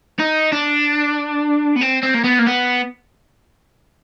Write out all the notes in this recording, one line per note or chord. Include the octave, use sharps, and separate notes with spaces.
D#4
D4
B3
C4
C4
A#3
B3
A#3
B3